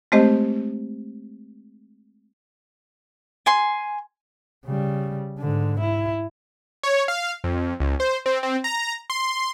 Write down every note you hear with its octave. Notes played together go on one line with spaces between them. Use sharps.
G#3 A3 C4 G4 C5 D#5
G#5 C6
C#3 G3
G#2 D3
E4
C#5
F5
F2
C#2
C5
C4
C4
A#5
C6